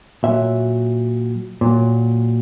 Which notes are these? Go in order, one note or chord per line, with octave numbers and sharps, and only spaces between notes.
A#2 F#3 E5
A#2 F#3